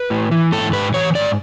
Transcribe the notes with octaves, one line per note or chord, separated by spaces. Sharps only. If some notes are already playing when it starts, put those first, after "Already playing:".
Already playing: B4
A2
E3
G#2 A4
G#2 B4
E3 C#5
G#2 D5